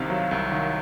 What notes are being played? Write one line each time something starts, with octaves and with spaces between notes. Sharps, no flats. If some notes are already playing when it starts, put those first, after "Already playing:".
Already playing: C2 C3 D#3 F5
F#3
C2
D#3